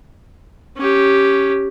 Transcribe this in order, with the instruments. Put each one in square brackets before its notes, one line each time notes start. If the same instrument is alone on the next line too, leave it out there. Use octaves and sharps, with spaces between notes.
[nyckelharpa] C#4 G4